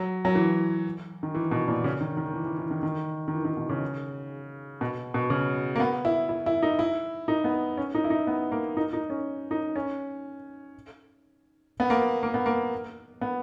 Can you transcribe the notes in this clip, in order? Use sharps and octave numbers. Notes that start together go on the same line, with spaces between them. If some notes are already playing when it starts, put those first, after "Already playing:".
Already playing: F#3
F#3
E3
D#3
E3
B2
A#2
C#3
D#3
D#3
E3
E3
E3
D#3
D#3
D#3
E3
D#3
B2
C#3
B2
B2
C#3
A#3
B3
E4
E4
E4
D#4
E4
D#4
B3
C#4
D#4
E4
D#4
B3
A#3
D#4
D#4
C#4
D#4
C#4
B3
A#3
A#3
B3
A#3
B3